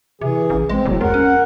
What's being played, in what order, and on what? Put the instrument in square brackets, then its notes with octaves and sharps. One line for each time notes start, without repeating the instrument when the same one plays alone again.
[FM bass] C3 [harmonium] E3 G#4
[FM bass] A1
[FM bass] G#3 [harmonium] C4
[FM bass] F#1 [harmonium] A2 F#3
[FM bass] E2 [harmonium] A#4 [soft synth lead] F#5
[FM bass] C#4